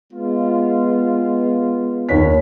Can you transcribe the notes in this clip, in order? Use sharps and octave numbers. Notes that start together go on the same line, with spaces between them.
G#3 B3 F4
D#2 C#5 B6